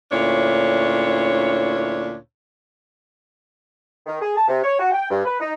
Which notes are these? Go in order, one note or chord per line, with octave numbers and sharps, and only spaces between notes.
D2 A#2 C#4 D4 E4 C#5
D#3
G#4
A5
C3
C#5
F#4
G5
G2
B4
D#4